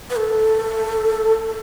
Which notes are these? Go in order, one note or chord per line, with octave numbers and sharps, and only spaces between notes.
B4
A4